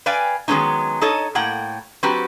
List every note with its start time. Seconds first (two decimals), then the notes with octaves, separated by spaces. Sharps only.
0.06 B4 D5 F5 G5 G#5
0.48 D#3 F#3 G#3 B3 C#4 D#4
1.01 D#4 A4 C#5 D#5
1.35 A2 A#3 F#5 G5
2.03 F#3 C4 F#4 G4 B4